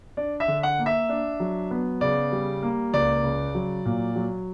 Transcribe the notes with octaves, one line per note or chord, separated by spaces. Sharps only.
D4 D5
E5
D3
F#5
A#3
E5
D4
F#3
B3
C#3 D5
G3
A#3
C#2 D5
C#3
F#3
A#2
F#3